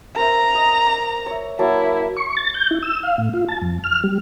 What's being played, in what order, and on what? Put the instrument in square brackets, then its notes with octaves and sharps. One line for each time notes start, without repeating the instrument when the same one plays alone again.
[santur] A#4 C5 E5 [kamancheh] A#5
[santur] D#5
D6
C#5 E5
[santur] F#3 A#3 A5 [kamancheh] E4
[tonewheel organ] C#6
A6
G6
E4
E6
F5
A2
F4
A5
F2
F6
G3